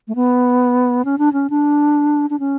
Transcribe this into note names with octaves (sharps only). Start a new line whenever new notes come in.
A3
B3
C#4
D4
C#4
D4
D4
C#4